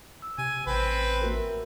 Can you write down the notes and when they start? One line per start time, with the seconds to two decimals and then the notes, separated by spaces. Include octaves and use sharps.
0.22 E6
0.38 C3 G#5
0.67 A1 C4 B4
1.22 A#3 F#4 A#4